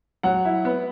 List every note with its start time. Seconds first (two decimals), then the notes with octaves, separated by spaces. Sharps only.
0.23 F#3 F#5
0.45 E4
0.65 B3